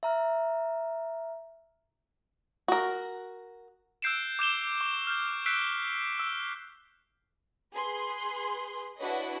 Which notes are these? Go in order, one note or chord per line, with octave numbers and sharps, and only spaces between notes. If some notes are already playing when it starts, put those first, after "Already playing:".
E5 A#5 F6
F#4 A#4
E6 F#6 G6 C7 D7 E7
D6 G6 E7 G7
C#6
F6 G6
E6 F#6 B6 C7 D7
E6
G#4 B4 C6
D4 E4 F#4 B4 C#5 D#5